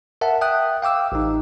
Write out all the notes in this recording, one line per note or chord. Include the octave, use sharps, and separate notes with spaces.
A#4 E5 F#5 A5
E5 G5 D#6 F#6
F5 G5 D6 E6
A1 D#4